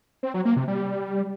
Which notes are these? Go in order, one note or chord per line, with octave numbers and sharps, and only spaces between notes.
C4
F#3
A#3
C3
G3